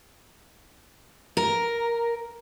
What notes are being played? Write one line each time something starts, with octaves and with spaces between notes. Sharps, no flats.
A#4